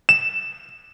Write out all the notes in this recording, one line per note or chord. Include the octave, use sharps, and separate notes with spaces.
E7